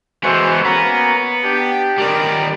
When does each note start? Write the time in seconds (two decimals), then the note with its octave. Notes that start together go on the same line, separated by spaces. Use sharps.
0.23 E3 G#3 B3 F#4 A4 C5
0.65 A#3 B3 C#4 F#4 A#5
1.44 D4 G4
1.98 D#3 G3 B3 A#4 D5